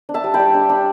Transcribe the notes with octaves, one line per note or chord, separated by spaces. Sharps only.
D4
E5 A5
G3
G5 B5
G3
D4
D4